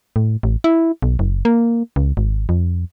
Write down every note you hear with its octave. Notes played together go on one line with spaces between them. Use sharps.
A2
A1
E4
B1
F#1
A#3
C#2
G#1
F2